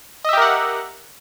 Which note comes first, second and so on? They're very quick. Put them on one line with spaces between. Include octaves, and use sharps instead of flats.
D#5 E5 G4 A#4 F#5